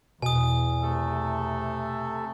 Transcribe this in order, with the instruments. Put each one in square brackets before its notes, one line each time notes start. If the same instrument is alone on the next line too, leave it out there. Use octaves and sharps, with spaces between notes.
[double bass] E2 [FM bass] B2 [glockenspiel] G#5 D#6
[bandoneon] C3 A3 A4